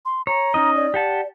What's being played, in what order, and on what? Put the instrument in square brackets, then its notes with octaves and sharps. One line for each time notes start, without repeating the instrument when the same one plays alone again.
[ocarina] C6
[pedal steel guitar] C#5 [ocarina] A#5
[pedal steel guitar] C#4 D#4 D#5
[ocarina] D5
[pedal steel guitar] G4 F#5 A5